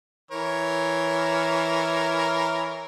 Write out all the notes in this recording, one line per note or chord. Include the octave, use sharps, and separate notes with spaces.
E3 A#4 C#5